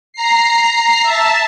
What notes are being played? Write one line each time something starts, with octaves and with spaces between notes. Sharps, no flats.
A#5 C7
E5 A5